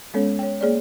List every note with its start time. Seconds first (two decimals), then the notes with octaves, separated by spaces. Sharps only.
0.14 G#3 B3 C#4 A4 C#5
0.39 C#5 G5
0.61 A#3 G#4 C#5 D5